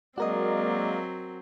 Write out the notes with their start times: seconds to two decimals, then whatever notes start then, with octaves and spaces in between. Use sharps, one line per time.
0.18 F#3 G#3 A#3 C4 F#4 A#4 D5 D#5